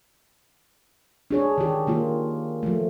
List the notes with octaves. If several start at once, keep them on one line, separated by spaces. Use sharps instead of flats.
D4 G#4 C#5
D#3 G4
D#3 A#3 F4
F3 A3